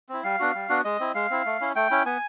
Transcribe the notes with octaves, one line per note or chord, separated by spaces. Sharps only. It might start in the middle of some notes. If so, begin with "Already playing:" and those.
C4 E4
G3 F5
B3 D4 F#4
G3
B3 D4 F#4
G#3 D#5
C4 E4
G#3 F5
C4 E4
A3
C#4 E4
A3 G5
C#4 E4
B3 G#5